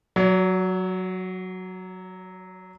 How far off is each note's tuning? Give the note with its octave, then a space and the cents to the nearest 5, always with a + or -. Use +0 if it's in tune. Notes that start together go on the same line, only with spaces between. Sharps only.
F#3 +0 C#5 +45